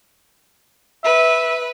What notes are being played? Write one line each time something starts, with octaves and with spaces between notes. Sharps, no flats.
B4 E5